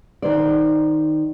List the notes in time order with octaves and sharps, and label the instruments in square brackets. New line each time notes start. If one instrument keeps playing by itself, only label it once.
[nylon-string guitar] D#3 C5 D5